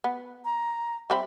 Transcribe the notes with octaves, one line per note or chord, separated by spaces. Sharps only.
B3
A#5
G3 C4 E5 B5